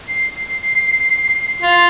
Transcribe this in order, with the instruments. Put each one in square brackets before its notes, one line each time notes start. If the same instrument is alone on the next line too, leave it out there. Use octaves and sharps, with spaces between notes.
[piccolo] C7
[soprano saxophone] F4